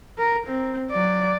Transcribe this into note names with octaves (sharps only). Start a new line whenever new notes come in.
A#4
C4
F#3 D5